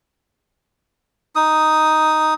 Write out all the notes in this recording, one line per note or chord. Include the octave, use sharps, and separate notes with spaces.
D#4 D#6